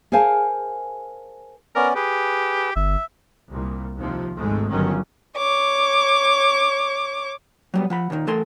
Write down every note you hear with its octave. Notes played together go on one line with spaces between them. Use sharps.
G#4 A#4 C5 F5 G#5 A5
B3 C#4 A#4 D5
G4 G#4 B4
G1 E5
C2 A#2
D#2 C3 F3
G#1 D2 G#2 G#3 A3
G1 G2 D3 D#3 F#3 C#4
C#5 D6
F#3 G3 B3
F3 F#5 B5
D#2 A#2 D3 D#3
E3 A3 A4 A#4 C6